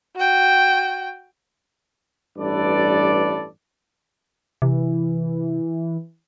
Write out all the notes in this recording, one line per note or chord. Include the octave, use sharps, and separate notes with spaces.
F#4 G5
A1 G2 A4 B4 D5
C3 E3